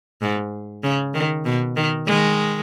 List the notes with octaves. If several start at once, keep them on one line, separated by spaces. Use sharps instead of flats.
G#2
C#3
D#3
B2
D#3
D#3 G#3